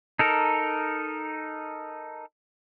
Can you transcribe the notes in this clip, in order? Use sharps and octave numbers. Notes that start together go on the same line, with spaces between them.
D#4 A4 A#4